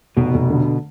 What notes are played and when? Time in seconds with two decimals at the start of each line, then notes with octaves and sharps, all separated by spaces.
0.17 F1 B2
0.34 F1
0.50 D3